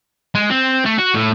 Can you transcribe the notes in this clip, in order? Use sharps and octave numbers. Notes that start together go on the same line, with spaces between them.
G#3
C4
A3
F#4
A2